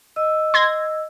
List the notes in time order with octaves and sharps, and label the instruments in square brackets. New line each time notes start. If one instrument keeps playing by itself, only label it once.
[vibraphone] D#5 E6
[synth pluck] C6 G#6 A#6